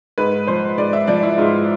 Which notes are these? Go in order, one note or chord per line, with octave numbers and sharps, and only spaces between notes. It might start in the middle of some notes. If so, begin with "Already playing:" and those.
G#2 B4
F3 C5
G#2 D5
E5
F3 D5
E4
G#2 F4